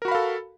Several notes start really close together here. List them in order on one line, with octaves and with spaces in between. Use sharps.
A#4 F#4 B5 F5 A4